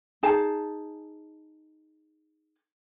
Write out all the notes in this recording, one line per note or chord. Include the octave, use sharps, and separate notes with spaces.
D#4 G#4 A5